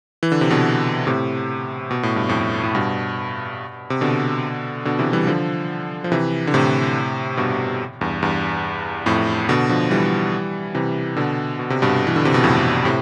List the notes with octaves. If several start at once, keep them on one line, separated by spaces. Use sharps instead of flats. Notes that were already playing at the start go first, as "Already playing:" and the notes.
E3
D3
C3
B2 D3
A2 C3
B2
A2
G2
F2 A2
A2
G2 B2
C3
B2 D3
B2 D3
C3 E3
E3 G3
D3 F3
F3
C3 E3
D3
A2 C3
G2 B2
E2 G2
E2 G2
F2 A2
B2 D3
D3 F3
E3 G3
C3 E3
B2 D3
B2
C3
G2 B2
E3
D3
C3
B2
F2 A2
A2 C3